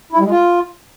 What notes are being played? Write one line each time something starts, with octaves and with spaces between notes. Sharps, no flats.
E4
G3
G#3
F4